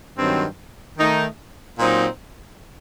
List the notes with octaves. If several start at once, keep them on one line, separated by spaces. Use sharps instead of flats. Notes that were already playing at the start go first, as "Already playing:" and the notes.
G2 D#3 F#3 C4
D#3 A3 D#4
A#2 F#3 C4 D#4